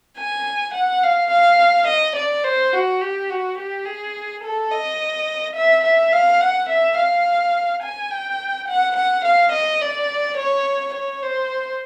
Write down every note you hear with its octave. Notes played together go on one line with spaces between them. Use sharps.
G#5
F#5
F5
F5
D#5
D5
C5
F#4
G4
F#4
G4
G#4
A4
D#5
E5
E5
F5
F#5
E5
F5
G#5
G5
F#5
F#5
F5
D#5
D5
C#5
C#5
C5